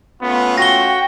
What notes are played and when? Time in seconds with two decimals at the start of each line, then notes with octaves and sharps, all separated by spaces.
0.21 A3 B3 C#4 F4
0.58 F#4 G5 A#6 G7